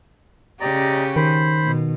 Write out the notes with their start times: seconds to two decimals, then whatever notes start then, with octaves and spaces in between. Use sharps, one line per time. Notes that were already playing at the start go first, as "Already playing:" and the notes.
0.61 C#3 C#4 G4 D5 D#5 A#5
1.16 D#3 C5 B5
1.64 B2